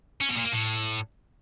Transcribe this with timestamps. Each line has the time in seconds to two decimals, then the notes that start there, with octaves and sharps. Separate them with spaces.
0.21 C#4
0.29 B2
0.36 A#2
0.44 A#3
0.52 A2